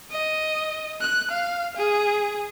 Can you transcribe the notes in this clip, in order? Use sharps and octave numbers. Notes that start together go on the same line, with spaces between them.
D#5
F#6
F5
G#4